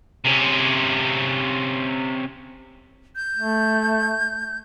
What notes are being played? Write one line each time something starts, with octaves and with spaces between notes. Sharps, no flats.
C3 C#4
G6
A3